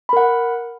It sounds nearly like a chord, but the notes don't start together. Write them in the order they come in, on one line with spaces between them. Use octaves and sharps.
B5 A#4 F#5